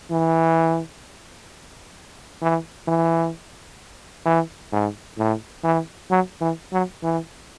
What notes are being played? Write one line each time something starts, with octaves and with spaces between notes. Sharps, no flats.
E3
E3
E3
E3
G#2
A2
E3
F#3
E3
F#3
E3